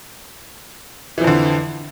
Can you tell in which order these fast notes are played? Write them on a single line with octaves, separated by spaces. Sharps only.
E3 F3 F2 D3